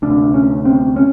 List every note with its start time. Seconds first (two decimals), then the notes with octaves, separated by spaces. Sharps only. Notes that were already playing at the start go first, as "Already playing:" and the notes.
0.02 D2 C3 D4
0.34 C#4
0.65 C4
0.96 C#4